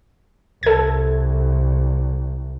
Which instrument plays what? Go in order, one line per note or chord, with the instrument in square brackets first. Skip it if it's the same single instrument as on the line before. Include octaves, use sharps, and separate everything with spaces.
[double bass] C2 [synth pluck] A4 G#6